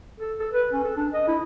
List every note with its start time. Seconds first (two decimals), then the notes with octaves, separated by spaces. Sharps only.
0.20 A4
0.40 A4
0.53 B4
0.72 C#4
0.84 A4
0.96 D4
1.13 D#5
1.28 E4